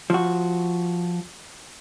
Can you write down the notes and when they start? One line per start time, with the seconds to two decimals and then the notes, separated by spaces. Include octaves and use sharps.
0.10 F3 F#4